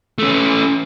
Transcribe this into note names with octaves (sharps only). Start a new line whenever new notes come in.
A3 C#4